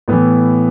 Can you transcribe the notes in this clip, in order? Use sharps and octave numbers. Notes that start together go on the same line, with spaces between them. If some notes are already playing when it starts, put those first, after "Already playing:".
A2 E3 B3